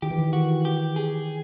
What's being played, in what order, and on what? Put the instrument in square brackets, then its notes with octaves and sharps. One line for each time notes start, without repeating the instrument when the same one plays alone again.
[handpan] D#3 [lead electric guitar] G4
[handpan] E3
D#3
[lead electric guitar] F#4
G4
G#4